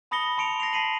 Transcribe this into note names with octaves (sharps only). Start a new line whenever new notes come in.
A5 B5 D#6 A#6 C#7 G7
A5 C6 C#7 D7 F7
A#6 C7 F7
A5 B6 C7 D#7 F#7